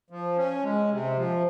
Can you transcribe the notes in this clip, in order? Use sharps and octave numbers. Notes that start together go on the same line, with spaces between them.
F3
C#4
G#3
C3
F3